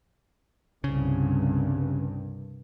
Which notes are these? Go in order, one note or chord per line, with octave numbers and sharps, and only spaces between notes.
C2 G2 C#3